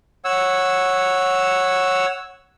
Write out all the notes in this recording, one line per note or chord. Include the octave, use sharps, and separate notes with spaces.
C#5 F#5 E6